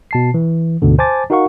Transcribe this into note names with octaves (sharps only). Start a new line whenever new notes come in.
B2 A5 C7
E3
D2 G#2 B2 D3
C5 G#5 A5 D6 A6
D#4 F#4 A#4 F5 F#5 C#6